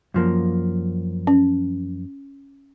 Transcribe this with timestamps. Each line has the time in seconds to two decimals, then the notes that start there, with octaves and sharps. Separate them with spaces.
0.14 F#2 F3 A#3
1.27 C#4